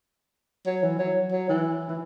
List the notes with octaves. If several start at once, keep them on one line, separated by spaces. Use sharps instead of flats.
F#3
E3
F#3
F#3
E3
E3